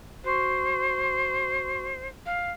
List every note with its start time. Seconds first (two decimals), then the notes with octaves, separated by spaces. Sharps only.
0.24 F#4 C5 C6 C#6
2.26 F5